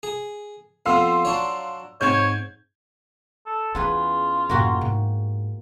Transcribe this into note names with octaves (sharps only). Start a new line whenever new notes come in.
G#4
F2 B3 F5 C6 E6
F#3 D4 C#5
G#2 C4 C#5 G6 G#6
A4
E2 C#4 F4 G#4 B4
F#2 A2 A#3 F#4 G4
G#2